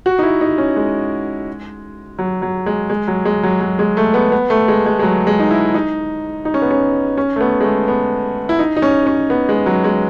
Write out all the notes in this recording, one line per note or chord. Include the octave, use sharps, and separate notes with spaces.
F#4
D#4
E4
D#4
C#4
G#3
F#3
F#3
G#3
G#3
F#3
G#3
F#3
F#3
G#3
A3
B3
B3
A3
G#3
G#3
G#3
F#3
G#3
D#4
E4
D#4
D#4
C#4
B3
C#4
C#4
A3
B3
G#3
A3
B3
E4
D#4
D#4
C#4
C#4
B3
G#3
F#3
G#3